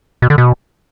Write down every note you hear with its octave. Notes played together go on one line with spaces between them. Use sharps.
B2
D3
B2